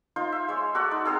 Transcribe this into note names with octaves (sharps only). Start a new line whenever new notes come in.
D#4 F4 C5
E5
G#3 C5 C#5
F#4 A4 D5 F#5
D#4
C4 D#4 G#4 A4